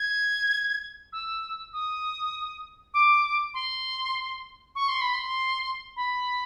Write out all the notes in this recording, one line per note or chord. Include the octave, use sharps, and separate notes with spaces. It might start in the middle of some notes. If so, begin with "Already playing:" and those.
Already playing: G#6
E6
D#6
D6
C6
C#6
C6
B5
C6
B5